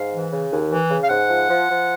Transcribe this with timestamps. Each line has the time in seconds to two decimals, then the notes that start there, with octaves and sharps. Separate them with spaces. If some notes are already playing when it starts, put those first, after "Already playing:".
Already playing: G#2 F5
0.13 E3
0.31 C#3
0.51 D#2
0.70 E3
0.91 C#3
1.03 F5
1.09 G#2 F#5
1.29 F3
1.49 F3
1.69 F3